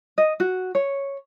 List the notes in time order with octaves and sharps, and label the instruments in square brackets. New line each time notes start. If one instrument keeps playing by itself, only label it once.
[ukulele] D#5
F#4
C#5